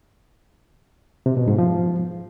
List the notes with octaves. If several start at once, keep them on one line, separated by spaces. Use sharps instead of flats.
C3
B2
G#2
F3